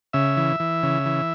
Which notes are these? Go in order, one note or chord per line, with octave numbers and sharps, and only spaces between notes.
C#3 E5
E3
E3
C#3
E3